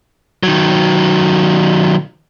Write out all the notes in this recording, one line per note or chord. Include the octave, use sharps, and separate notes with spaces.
D#3 F#3